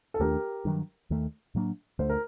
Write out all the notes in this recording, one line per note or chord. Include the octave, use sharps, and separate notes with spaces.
A4
D#2 D#3 A3 D4 G4 A#4
G2 D#3 F#3
D#2 D#3 A3
A2 F#3 A#3 D4
D2 D3 A3 C5
A#4